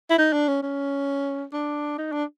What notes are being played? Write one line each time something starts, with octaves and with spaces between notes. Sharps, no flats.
E4
D#4
D4
C#4
C#4
D4
D#4
D4